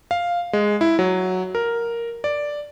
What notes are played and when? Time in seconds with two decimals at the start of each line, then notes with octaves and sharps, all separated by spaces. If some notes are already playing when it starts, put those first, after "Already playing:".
0.11 F5
0.53 G#3
0.81 E4
0.99 F#3
1.55 A#4
2.24 D5